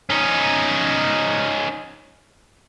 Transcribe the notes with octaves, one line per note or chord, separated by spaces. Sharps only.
C#4 D#4